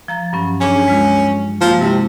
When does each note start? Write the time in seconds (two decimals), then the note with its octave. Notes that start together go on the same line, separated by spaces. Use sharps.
0.08 F3 A#5 A6
0.33 G2 F#3 C#4
0.61 C#4 D4 G#4
0.88 G#3 F4
1.61 F3 A#3 F#4
1.80 C3 G#3 E4 A5